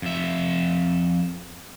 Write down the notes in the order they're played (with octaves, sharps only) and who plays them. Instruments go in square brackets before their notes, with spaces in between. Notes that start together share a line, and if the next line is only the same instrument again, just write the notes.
[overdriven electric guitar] F2 E5